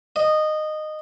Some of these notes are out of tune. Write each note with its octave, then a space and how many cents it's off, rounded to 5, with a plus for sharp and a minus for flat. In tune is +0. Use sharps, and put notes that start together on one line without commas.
D#5 -15